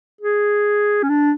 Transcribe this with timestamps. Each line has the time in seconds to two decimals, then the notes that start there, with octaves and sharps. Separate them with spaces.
0.21 G#4
1.03 C#4
1.09 D4